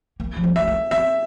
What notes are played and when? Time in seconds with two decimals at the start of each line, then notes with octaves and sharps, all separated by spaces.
0.20 A#3
0.37 F3
0.44 G3
0.56 A3 E5
0.68 A#3
0.91 C4 E5